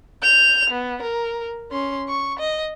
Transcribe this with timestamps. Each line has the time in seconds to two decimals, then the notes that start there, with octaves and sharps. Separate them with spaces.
0.23 G6 F7
0.70 B3
1.02 A#4
1.71 C#4 C6
2.09 C#6
2.39 D#5